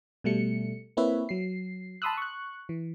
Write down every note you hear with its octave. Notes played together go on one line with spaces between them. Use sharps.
B2 G3 A3 C#7
A#3 C4 E4 B4 C#5 E5
F#3 C7
A5 B5 C6 D#6 E6 F#6
C#6 F#6
E3